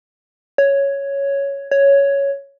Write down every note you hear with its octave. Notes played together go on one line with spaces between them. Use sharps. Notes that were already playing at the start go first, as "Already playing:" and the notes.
C#5
C#5